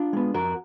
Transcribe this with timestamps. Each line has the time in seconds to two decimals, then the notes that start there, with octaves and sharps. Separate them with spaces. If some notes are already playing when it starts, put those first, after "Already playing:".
Already playing: D4 F4
0.13 G#3 B3
0.34 F2 F#4 A#4